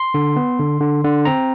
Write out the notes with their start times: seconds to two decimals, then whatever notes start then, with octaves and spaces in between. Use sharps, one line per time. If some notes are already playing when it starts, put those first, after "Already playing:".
Already playing: C6
0.14 D3
0.36 B3
0.59 D3
0.81 D3
1.04 D3
1.25 C4 A#5